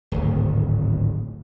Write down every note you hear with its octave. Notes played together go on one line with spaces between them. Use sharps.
D1 G#1